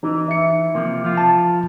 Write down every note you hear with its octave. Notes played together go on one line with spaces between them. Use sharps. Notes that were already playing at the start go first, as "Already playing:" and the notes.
E3 D#4
E5 C#7
C3 F3 A#3
F3 F4
A5